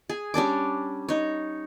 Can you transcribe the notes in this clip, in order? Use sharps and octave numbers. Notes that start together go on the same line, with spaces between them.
G#4
G3 C#4 D4 D6
D#4 C#5